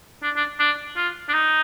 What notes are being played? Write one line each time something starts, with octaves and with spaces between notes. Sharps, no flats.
D4
D4
D4
F4
D4
D#4